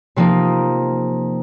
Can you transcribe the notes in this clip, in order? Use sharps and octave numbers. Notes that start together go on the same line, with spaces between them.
C3 F3 A#3 D#4